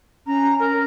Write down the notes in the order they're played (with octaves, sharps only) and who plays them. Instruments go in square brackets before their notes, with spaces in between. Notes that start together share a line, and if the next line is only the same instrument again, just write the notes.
[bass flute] C#4 [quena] A#5
[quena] A#4